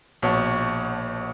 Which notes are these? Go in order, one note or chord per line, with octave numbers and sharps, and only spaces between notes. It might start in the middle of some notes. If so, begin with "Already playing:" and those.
A#1 B2 C#5 F#5 A5 C#6